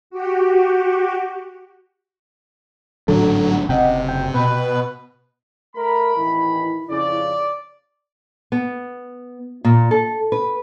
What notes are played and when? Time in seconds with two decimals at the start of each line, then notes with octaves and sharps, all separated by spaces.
0.10 F#4 G4
3.08 G#1 A2 D3 F#3 A4
3.69 F#1 C3 D#5 F#5 G5
4.09 G5
4.34 B2 B4
5.76 A3 A#4 B5
6.16 A1 D#2 E3 E4
6.90 F2 C#3 D5
8.52 B3
9.65 A#2
9.91 A4
10.32 B4